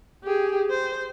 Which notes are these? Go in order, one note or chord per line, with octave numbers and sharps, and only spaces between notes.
G4 G#4
C5